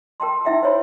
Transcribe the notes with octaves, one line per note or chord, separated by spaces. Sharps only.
A#4 G5 A5 C6
D#4 E4 E5 F#5 G5
C5 C#5 B5